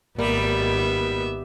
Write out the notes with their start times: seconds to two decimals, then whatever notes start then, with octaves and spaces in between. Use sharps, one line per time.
0.19 G#1 G3 A#3 B3 A#4 E5